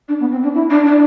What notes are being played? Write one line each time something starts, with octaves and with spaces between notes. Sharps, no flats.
D4
B3
C4
D4
E4
D4
D4